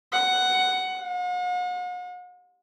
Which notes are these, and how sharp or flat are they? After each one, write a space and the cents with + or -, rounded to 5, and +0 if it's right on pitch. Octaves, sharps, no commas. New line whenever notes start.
F#5 +10
F#5 -45